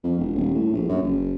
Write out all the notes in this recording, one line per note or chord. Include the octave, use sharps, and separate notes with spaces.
F2
E1
D#1
A2
A#1
F#2
F#1